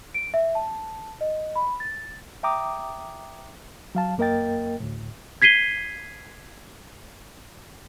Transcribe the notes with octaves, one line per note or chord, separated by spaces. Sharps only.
D7
E5
A5
D#5
B5
A6
E5 G5 A#5 D6 D#6
F#3 F5 A5
F#2 A#3 A#4 D#5 G5 A6
D2 A2
G#6 B6 C7 D#7 G7